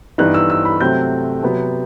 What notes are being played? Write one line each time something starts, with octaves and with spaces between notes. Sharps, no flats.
G2 E3 B3 D#4 F#6
E6
E6
B5
C3 F#3 A3 C4 G6
C3 F#3 B3